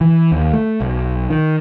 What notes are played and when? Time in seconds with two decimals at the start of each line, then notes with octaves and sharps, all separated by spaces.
0.01 E3
0.32 D#2
0.53 A3
0.81 B1
1.30 D#3